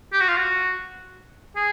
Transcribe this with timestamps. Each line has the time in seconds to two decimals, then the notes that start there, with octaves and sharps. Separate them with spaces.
0.13 G4
0.21 F#4
0.28 F4
0.37 F#4
1.56 G#4